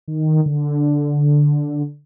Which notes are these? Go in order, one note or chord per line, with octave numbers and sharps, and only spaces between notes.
D#3
D3